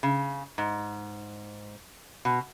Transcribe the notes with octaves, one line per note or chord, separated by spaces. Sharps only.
C#3
G#2
B2